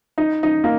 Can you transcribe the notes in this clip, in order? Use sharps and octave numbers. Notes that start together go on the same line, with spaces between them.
D#4
D#4
A#3